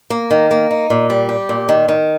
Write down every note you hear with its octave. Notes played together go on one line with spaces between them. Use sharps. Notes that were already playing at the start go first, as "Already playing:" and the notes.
A#3
D#3
A#3
D#4
A#2
G3
G4
A#2
D#3
D#3